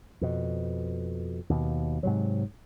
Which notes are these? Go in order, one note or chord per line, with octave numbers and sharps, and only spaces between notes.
F2 B2
D#2 B2
G#2 C3 F#3